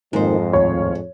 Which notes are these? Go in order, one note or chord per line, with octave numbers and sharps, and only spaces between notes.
F2 G#2 D#3 A#3 D#4 C5
D#2 A2 F4 C#5